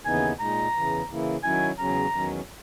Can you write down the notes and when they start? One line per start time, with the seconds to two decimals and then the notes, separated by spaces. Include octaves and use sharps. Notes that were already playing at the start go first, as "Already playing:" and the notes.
0.05 D#2 C#3 E3 B3 D#4 G#5
0.40 A#2 G#3 D#4 A#5
0.74 E2 C#3 E3
1.09 C#3 E3 A#3 E4
1.44 D#3 F#3 C#4 E4 G#5
1.78 E2 C#3 F#3 C#4 A#5
2.13 E2 D#3 F#3 C#4